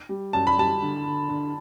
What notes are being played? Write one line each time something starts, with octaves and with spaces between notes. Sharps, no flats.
G3
F#2 A5
B5
G3 A5
D3
D3
D3